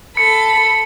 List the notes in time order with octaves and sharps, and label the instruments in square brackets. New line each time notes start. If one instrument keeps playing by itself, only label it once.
[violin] A4 B5 [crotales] C#7